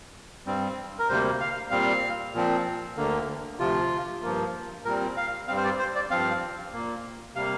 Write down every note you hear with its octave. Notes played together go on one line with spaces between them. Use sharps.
G2 G3 C4
A#4
D2 C3 G3 A#3 C5
F5
A#2 G3 C4 F5
A#2 F3 C4
D2 D3 A#3
D2 C3 F3 F4
G2 F3 A#3
A#2 G3 C4 A#4
F5
G2 G3 C4 F5
C5
D5
C5
D5
G2 F3 C4 F5
A#2 A#3
C3 G3 A#3 F5